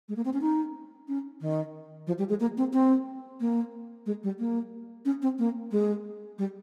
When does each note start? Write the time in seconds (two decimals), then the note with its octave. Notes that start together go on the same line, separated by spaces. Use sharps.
0.09 G#3
0.16 A#3
0.25 C4
0.33 C#4
0.41 D#4
1.08 C#4
1.41 D#3
2.07 F3
2.19 G3
2.29 G#3
2.40 A#3
2.57 C4
2.73 C4
3.40 A#3
4.06 G#3
4.23 G3
4.39 A#3
5.05 C#4
5.22 C4
5.39 A#3
5.72 G#3
6.38 G3